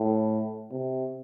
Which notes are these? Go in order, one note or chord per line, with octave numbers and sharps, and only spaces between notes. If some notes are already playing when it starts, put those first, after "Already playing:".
Already playing: A2
C3